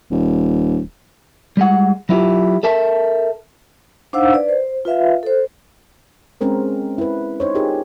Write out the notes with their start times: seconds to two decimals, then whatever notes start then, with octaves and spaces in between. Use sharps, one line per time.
0.11 D#1
1.57 G3 G#3 F#5
2.09 F#3 E4 F4 G4
2.63 A4 A#4 E5 A5
4.13 D4 D#4 C5 F5 F#5 E6
4.33 B4 D5
4.49 C5
4.85 F4 B4 E5 F5
5.23 A4 C5
6.41 G#3 C4 C#4 A#4 C5
6.98 E4 B4
7.40 D#4 C5 C#5
7.55 D#4 F4 G4 G#4 A#4